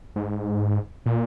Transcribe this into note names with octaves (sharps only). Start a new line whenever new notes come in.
G#2
A#2